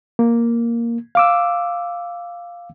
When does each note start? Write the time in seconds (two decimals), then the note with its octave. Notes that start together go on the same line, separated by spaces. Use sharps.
0.19 A#3
1.15 F5 D6 E6